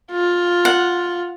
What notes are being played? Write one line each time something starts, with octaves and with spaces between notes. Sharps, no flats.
F4
F#5